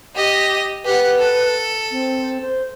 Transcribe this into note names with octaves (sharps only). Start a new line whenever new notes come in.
G4 D#5
G4 B4 F#5
A4
C4
C5